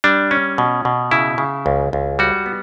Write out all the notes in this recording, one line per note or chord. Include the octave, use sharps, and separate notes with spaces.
G3 D4
C#4
B2
B2
C#3 E4
C#3
C#2
C#2
G3 F#4
B3